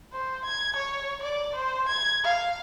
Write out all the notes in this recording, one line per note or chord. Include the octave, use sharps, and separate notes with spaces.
C5
G#6
C#5
D5
C5
G#6
F5